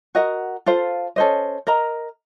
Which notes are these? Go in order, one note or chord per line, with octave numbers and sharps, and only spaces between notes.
F#4 A#4 D#5 F#5
F4 A4 C5 F5
C#4 A4 C5 D#5
A#4 D#5 A#5